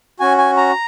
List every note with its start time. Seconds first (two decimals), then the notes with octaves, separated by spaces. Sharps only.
0.20 C#4 F#4 G#5
0.38 G#5
0.57 A#5